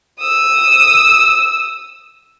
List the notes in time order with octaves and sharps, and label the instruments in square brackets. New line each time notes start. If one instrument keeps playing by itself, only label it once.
[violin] D#6 E6